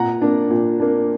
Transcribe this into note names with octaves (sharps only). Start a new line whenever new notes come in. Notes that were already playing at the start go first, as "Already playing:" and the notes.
Already playing: A#2 F#5 A#5
A#3 D4
A#2
A#3 D4